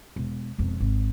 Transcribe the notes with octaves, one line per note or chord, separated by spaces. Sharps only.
E1
E1 F2
G#1